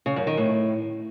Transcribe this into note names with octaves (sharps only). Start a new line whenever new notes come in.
C#3
F#2
D#3
A2